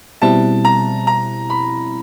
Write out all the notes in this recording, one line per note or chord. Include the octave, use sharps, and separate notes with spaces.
B2 G3 C4 E4 A5
A#5
A#5
B5